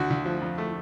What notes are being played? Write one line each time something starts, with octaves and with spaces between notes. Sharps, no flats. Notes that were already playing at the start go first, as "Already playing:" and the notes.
Already playing: D2 F#4
D2
F3
F2
A3